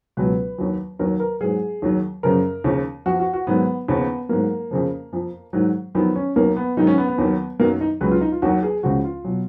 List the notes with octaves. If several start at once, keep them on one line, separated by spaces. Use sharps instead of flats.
C#2 B2 F#3 B4
D#2 D#3 F#3
D#2 D#3 F#3 A#4
A#4
G#2 F#3 G#4
D#2 D#3 F#3
F#2 C#3 F3 A#4
D#2 C#3 F3
F2 F3 F#4
F#4
F#4
G#2 D#3 F#3 B3
D#2 C#3 F3 B3
G#2 F#3 A#3
F2 C#3 F3
F2 F3
G#2 D#3 F#3
F2 D#3 F#3 B3
C#4
D#2 D#3 F#3 A#3
B3
G#2 D#3 F#3 D#4
C#4
B3
B3
D#2 D#3 F#3
F#2 D#3 F#3 A#3
D#4
C#2 C#3 F#3 B4
F4
D#4
F4
D#2 D#3 F#3 F#4
G#4
C#2 C#3 F3 F#4
F4
B2 F#3